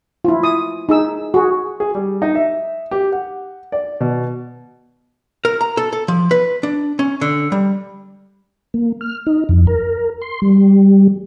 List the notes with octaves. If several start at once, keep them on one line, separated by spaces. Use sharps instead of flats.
E4 F4
D#6
D#4 G#4 E6
F#4 G#4
G#4
G3
D#4
E5
G4
F#5
D5
B2
A#4
A#5
A4
A4
F3
B4
D4
C#4
D3
G3
A#3
F6
D#4
F2
A#4
C6
G3